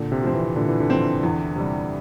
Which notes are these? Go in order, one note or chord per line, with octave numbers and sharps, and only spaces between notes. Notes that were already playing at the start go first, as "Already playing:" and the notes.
Already playing: A#2 D3
C3
F3 C4
E3
A#2 D3
E3
D3
F3 C4
E2
C3 G3